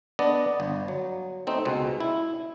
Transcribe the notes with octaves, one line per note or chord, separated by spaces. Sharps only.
B3 D4 D5 D#5
G1
F#3
A3 C4 D#4
C#2 B2
E4